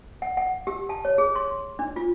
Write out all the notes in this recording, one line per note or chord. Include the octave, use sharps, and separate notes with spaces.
F#5
F#5
G4
A5
C#5
G#4
C6
D4
F4